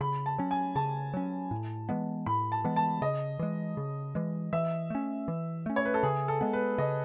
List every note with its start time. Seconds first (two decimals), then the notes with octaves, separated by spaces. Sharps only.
0.01 C#3 B5
0.26 A5
0.38 F#3 C#4
0.51 G#5
0.75 C#3 A5
1.14 F#3 C#4
1.51 A2
1.89 E3 G#3 B3
2.26 A2 B5
2.52 A5
2.64 E3 G#3 B3
2.76 A5
3.02 C#3 D#5
3.39 E3 G#3
3.77 C#3
4.15 E3 G#3
4.53 E3 E5
4.90 A3 C#4
5.28 E3
5.66 A3 C#4
5.76 C#5
5.85 B4
5.94 A4
6.03 C#3 G#4
6.28 A4
6.41 G#3 B3
6.53 B4
6.78 C#3 D#5